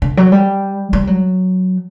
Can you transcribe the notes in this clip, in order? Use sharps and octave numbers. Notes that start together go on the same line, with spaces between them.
D3
F#3
G3
G3
F#3